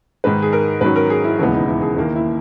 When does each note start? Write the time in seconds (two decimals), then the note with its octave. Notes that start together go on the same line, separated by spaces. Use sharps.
0.24 G#2 D#3 G#3 B4
0.42 G#4
0.53 A#4
0.81 G#2 D#3 F#3 C#4 B4
0.96 A#4
1.10 G#4
1.24 E4
1.38 E1 D#2 C#3 G#3 B3 E4
1.53 D#4
1.68 E4
1.82 G#4
1.96 D#2 D#3 A#3 E4
2.16 E4